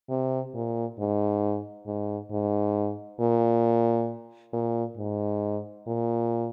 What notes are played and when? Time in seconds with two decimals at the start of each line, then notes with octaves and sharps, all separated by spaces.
0.10 C3
0.54 A#2
0.99 G#2
1.87 G#2
2.31 G#2
3.20 A#2
4.53 A#2
4.97 G#2
5.87 A#2